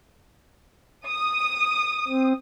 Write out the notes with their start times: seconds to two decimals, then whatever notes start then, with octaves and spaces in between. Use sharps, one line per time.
1.08 D#6
2.08 C4